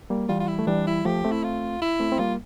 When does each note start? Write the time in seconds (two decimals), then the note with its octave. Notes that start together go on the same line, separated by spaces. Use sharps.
0.10 G3 A#3
0.29 E3 G3 F4
0.40 F4
0.48 E4
0.59 A3
0.67 E3 G3 D4
0.87 E4
1.05 F3 A3 G4
1.24 A3 C4
1.31 E4
1.44 F4
1.81 E4
2.00 A3 C4
2.12 C4
2.19 G3 A#3 F4